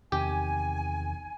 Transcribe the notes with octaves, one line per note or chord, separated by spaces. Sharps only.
E2 C3 D#3 G4 G#5